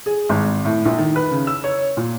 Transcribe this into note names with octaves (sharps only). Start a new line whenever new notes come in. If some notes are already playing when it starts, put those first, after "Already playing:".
G#4
G#1
A2
A#1
D#3
B4
C#3
E6
C#5
A#2